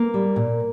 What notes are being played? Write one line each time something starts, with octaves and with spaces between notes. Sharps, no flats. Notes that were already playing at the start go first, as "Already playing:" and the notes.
Already playing: A#3
G3
A#2